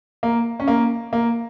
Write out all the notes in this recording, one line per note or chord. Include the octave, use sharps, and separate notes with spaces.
A#3
C#4
A#3
A#3